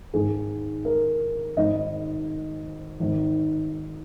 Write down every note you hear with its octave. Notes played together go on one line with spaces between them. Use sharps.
G#1 G#2 D#3 G#4
A#4
G#1 G#2 D#3 D#5
G#1 G#2 D#3